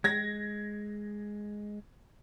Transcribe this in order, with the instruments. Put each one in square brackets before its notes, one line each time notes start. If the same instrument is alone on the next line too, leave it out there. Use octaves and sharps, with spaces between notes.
[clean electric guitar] G#3 [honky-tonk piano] G#6 A#6